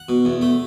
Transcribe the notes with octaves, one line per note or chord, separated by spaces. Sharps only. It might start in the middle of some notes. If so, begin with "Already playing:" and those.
Already playing: F#5
B2
E2
A3